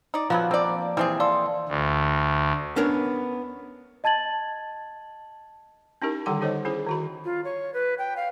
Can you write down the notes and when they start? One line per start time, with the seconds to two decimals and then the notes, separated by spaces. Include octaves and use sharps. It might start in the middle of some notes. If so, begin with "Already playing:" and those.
0.14 D#4 D5
0.30 F3 F#3 B3 F#4
0.51 A#3 C4 D5
0.97 E3 G3 C4 G#4
1.20 A4 D5 F5 C6
1.69 D2
2.76 B3 C#4 D4 A#4 C#5
4.04 D#5 A5 G#6 A6 F#7
6.02 C#4 D#4 E4 G4 A#4
6.26 D3 D#3 G3 A4 F#5 C6
6.41 D#4 A4 C5 C#5 D#5
6.65 C#4 E4 G#4 C5
6.87 D#3 F#4 B5
7.25 F4
7.44 C#5
7.74 B4
7.98 G5
8.16 F5